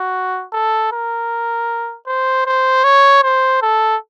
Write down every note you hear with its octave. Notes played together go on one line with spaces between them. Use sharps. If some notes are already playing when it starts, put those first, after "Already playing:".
Already playing: F#4
A4
A#4
C5
C5
C#5
C5
A4